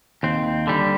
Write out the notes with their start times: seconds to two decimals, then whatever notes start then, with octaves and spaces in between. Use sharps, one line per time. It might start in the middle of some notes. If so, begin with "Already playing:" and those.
0.23 D#2 C4
0.67 D3 G3